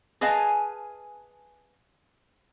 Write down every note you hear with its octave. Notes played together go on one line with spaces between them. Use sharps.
G#4 B4 D#5 F5 G#5 A5